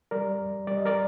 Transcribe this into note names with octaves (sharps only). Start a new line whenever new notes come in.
G3 A#4 D5
F2
G3 D5
D#5
A#4 D5